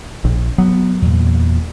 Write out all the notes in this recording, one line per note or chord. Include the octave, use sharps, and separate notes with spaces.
A#1
F#3 B3
E2 A#2